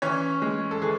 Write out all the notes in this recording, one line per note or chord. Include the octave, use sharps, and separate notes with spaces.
E3 C#4 C#5
G#3
A4
E3 G#4